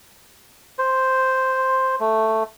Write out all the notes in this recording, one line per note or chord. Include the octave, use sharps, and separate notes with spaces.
C5
A3